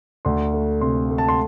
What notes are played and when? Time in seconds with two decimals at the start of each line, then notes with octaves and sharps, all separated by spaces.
0.25 D2 C6
0.54 A3
0.81 C3 C6
1.10 A3
1.18 A5
1.29 C6